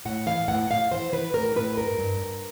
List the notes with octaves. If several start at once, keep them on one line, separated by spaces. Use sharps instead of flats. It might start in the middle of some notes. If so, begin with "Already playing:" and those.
A2 F#5
E3 F5
A2 F#5
A2 F5
E3 C5
E3 B4
A2 A#4
A2 B4
G2 A#4
G2
G2